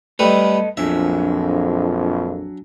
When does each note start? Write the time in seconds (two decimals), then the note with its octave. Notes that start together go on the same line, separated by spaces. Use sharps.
0.19 G3 A3 A4 B4 D#5
0.77 A#1 F2 F#3 D4 E5 G#5